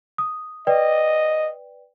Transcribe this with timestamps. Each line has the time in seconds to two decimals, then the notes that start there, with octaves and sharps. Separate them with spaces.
0.18 D#6
0.67 B4 D5 D#5 G5